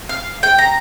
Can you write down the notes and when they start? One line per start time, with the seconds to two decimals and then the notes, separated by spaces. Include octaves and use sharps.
0.09 F5
0.43 G5
0.58 A#5